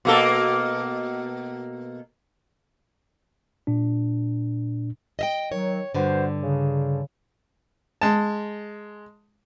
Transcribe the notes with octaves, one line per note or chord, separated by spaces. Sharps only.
B2 A#3 A4
A#2 D4
D#5 E5 G5
D#3 F#3 C#5
G2 D3 F#4 B4 C5
C#3
G#3 A5